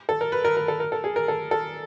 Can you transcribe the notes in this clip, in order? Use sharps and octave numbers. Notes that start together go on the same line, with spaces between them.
A4
A#4
B4
A#4
A#4
A4
A#4
A4
G#4
A#4
A4
A4